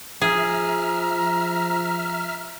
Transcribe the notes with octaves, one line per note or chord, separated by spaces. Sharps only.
F3 G#4 E5 A#5 F6